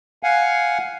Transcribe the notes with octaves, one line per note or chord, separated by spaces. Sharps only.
F5 F#5 G#5